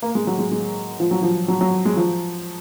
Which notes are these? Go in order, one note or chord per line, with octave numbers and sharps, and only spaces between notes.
A#3
G#3
F#3
G#3
G#3
F3
F#3
F3
F#3
F#3
G#3
F3